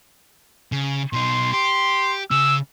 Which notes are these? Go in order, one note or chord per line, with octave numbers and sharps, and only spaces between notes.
C#3
B2 D#4 C6
G4 C6
C#3 C#4 E6